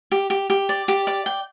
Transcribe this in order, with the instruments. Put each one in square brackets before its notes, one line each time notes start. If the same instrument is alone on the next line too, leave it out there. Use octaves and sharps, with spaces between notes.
[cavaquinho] G4
G4
G4
D5
G4
D5
G5